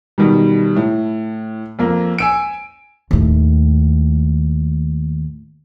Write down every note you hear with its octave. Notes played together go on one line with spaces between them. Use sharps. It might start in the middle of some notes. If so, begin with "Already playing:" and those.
B2 D#3 G3
A2
F2 A#3
G#5 E6 D7
D#2 A2